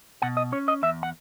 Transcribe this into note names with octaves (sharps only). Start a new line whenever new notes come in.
B2 F#5
D#5
C#4 C#5
D#5
E2 E5
F#5